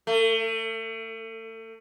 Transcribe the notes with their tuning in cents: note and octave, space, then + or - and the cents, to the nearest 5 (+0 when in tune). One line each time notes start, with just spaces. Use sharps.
A3 +35